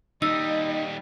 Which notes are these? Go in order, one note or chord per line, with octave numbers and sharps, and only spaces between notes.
D#2 G3 D#4 D#5 E6